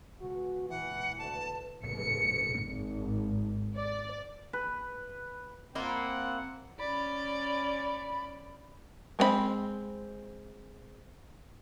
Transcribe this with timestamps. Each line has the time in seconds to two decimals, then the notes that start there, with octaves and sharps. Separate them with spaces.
0.21 C#2 B2 G#3 F#4
0.70 E2 A#2 E3 F#5
1.19 D2 E4 F#4 B4 A5
1.86 C#7
2.63 G#1
3.76 D5
4.53 B4
5.75 A#3 C4 E4 F4 F#5
6.79 C#4 D5 B5
9.19 G#3 C4 C5 B5